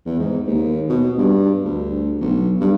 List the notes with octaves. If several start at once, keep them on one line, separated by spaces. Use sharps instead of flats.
E2
G#2
D#2
B2
G2
D2
B1
G2